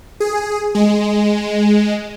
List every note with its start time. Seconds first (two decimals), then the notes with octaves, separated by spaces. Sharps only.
0.20 G#4
0.75 G#3